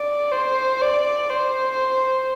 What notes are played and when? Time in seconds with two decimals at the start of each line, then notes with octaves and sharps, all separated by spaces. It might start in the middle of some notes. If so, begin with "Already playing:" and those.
Already playing: D5
0.32 C5
0.81 D5
1.30 C5